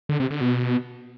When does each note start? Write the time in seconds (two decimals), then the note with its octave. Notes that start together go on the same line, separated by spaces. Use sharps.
0.09 D3
0.20 C3
0.30 D3
0.41 B2